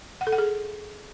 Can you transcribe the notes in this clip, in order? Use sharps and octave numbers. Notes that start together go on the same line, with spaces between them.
F#5
A4
F#5
G#4